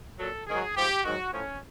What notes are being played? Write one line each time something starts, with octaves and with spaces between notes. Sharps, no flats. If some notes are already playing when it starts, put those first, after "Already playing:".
A#2 F#3 A4
G#2 D#3 F#3 G#4
G#2 F3 G4
G#2 D#3 F#3 F#4
A2 F3 C#4